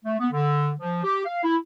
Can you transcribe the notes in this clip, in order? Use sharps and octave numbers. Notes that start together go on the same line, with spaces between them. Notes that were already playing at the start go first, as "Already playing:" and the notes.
A3
B3
D3
F3
G4
F5
E4